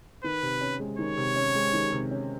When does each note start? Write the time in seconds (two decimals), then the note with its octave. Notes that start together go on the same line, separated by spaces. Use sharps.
0.24 D#3 B4
0.42 C3
0.61 C#4
0.79 G#3
0.98 D#3 C#5
1.17 C3
1.36 C#4
1.55 G#3
1.73 D#3
1.92 C3
2.11 C#4